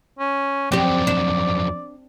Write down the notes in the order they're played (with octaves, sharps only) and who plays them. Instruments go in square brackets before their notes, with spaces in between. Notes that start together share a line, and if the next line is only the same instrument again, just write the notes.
[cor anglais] C#4
[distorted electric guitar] F2 F#3 [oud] C4 G4 [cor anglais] D5
[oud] D4